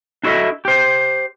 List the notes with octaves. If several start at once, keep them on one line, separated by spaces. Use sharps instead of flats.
D4 E4 F#4 A4 D#5 E5
G4 C5